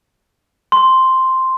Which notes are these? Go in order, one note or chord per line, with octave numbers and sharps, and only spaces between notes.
C6